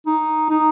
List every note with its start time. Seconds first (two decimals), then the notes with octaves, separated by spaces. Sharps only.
0.06 D#4
0.49 D#4